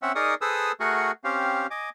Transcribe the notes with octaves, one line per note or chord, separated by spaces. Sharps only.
C4 C#4 E5 F#5
D#4 G#4 A#4 D5 C#6 D#6
G#4 A4 B4 C5 D#6 E6
A3 F#4 G#4 A#4 F#5 C#6
C4 C#4 G4 F5
D#5 G#5 D6